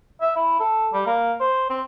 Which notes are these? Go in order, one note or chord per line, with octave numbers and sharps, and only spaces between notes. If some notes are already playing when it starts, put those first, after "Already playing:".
E5
E4
A4
G3
A#3
C5
C4